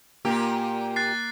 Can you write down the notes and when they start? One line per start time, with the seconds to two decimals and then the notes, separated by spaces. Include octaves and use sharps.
0.25 A#2 A#3 G4
0.96 F#6 A6 C7